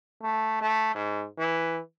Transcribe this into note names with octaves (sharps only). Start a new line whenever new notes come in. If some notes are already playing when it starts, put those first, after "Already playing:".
A3
A3
G#2
E3